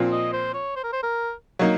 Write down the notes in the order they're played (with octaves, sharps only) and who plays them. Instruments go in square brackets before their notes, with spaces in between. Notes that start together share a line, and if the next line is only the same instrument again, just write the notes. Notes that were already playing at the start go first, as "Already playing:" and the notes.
Already playing: [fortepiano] A#2 F3 C4
[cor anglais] D#5
C5
C#5
C5
A#4
C5
A#4
[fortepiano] F#3 A#3 D#4